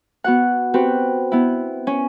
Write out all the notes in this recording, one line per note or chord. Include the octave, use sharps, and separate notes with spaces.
B3 F#4 F#5
C4 F#4 G4 B4
B3 E4
C#4